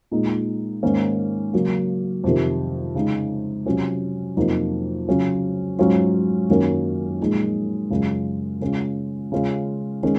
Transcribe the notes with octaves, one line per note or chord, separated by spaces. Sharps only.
A#2 G#3 D#4
G#2 D#3 A#3 C#4
C#3 F#3 A#3
F2 C3 D#3
C#3 G#3 D#4
C3 F#3 C#4 F4
F2 C3 F#3 A#3 D#4
C#3 F#3 C#4 F4
G#2 F#3 C#4 F4
F#2 D#3 F#3 A#3 C#4
A#2 F3 G#3 D#4
F#2 C#3 G#3 C#4 F4
C#3 G#3 C#4 F4
C#3 G#3 C#4 F4
D#3 G#3 C#4